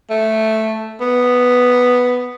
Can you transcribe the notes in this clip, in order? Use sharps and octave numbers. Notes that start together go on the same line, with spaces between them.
A3
B3